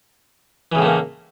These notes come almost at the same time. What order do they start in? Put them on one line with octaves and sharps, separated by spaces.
E3 C#3 A2 A3 A#3